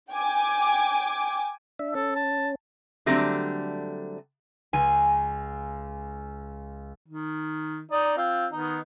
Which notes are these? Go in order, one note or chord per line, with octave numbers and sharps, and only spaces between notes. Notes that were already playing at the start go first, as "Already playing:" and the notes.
G5 G#5 D6
D4 E5
C#4 A4
A5
D3 F#3 G3 A3 C4 D4
C#2 G#5 D#7
D#3
D#4 D5 D#6
C4 F4
D#3 B3 D#4